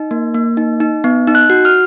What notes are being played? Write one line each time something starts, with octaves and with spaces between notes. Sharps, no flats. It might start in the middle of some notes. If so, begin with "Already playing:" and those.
Already playing: D#4
A#3
A#3
D#4
D#4
B3
D#4
F#6
F#4
F6